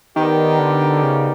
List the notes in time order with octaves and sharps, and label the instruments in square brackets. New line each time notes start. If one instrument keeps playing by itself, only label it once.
[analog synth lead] D#3 [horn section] B3 D#4 G4 A#4 D5
[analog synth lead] D3
C#3